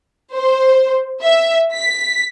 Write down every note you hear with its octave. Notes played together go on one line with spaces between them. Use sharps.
C5
E5
B6